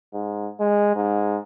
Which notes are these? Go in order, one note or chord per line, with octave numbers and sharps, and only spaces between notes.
G#2
G#3
G#2